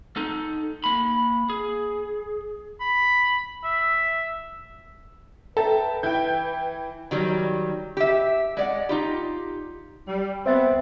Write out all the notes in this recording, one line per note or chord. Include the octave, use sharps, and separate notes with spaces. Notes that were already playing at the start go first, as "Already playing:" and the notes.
D#4 A4
A#3 B5
G#4
B5
E5
A4 B4 E5 G5 A5 A#5
E3 E4 G5 G6
D#3 F#3 G3
G4 E5
G#3 D5 F#5
D#4 F4 G4
G3
B3 C4 C5 E5 A6